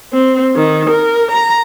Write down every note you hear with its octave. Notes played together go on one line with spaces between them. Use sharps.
C4
D#3
A#4
A#5